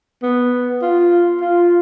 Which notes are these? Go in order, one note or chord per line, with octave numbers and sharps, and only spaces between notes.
B3
F4
F4